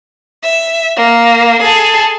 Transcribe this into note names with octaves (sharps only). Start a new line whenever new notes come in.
E5
A#3
G#4 A4